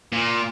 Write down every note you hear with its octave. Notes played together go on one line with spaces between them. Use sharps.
A#2